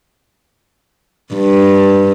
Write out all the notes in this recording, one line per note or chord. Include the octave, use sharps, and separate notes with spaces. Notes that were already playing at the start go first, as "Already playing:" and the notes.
G2